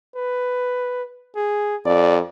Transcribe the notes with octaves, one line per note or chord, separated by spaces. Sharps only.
B4
G#4
F2 D5